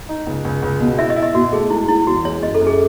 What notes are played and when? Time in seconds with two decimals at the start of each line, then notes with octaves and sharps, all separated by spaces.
0.09 D#4
0.27 C#2
0.45 C#2
0.62 C#2
0.81 B2
0.98 E4 E5
1.10 D#5
1.16 E4
1.22 D#5
1.35 B2 F#4
1.53 A3 G#4
1.70 G#3 E4
1.88 G#3 E4
2.07 E2 F#4
2.25 G#3 C#5
2.42 F#2 D#5
2.55 A4
2.61 F#2
2.67 G#4